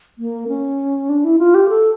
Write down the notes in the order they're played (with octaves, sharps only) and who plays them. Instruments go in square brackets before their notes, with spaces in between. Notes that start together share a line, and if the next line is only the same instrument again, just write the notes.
[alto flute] A#3
C#4
D4
E4
F4
G4
A4